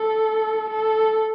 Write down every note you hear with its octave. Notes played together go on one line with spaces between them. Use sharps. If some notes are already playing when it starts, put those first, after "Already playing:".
Already playing: A4
A4